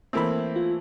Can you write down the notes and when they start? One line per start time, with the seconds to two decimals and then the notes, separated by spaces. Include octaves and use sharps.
0.13 E3 A3 A#3 C4 E4 A4 A#4 B5
0.56 F4